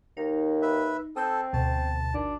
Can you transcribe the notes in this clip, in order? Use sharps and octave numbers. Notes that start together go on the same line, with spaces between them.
D#2 D#4
B4 E5
C4 A4 D#6 E6 G6
D2 B2 A5
G#1 D4